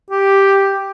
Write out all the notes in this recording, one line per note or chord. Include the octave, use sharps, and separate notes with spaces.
G4